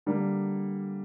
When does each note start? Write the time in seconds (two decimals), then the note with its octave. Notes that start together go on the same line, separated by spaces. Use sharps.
0.06 D3 G3 A#3